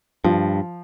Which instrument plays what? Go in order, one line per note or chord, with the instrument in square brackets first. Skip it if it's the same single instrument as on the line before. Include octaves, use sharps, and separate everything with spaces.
[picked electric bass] G2 [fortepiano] F3